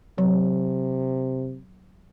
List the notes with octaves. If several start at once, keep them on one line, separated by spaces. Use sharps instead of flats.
C3 F#3